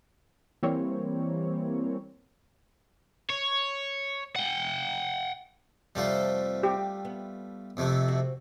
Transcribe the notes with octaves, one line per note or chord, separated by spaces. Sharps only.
E3 G3 A#3 C4 C#5
C#5
F#5 G5
F2 C3 F3 G3 A3 F4
G4
B3
F2 C3 A3
C4 F#4